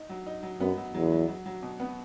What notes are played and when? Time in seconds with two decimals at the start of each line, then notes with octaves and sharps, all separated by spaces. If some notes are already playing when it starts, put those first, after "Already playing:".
Already playing: D#4
0.09 F#3
0.27 D#4
0.43 F#3
0.60 F#2 B3
0.77 F#3
0.94 E2 F#3
1.12 F#3
1.28 F#3
1.46 F#3
1.62 B2
1.80 B3